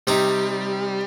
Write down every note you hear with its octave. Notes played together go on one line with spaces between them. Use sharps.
C3 G3 D#4